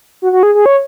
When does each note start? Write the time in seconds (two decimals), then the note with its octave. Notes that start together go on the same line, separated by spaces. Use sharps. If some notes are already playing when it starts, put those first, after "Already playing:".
0.22 F#4
0.33 F#4
0.43 G#4
0.55 G#4
0.66 C#5